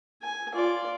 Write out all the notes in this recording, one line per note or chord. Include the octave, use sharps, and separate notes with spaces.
G#5
F4 D5